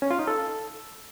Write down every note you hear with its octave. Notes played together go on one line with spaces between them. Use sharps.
C#4
F4
D#4
A4